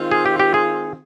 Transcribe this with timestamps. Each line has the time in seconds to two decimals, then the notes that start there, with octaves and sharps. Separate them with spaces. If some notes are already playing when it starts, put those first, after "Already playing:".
Already playing: D#3 G#3 C4 F4
0.11 G#4
0.26 G4
0.40 G4
0.54 G#4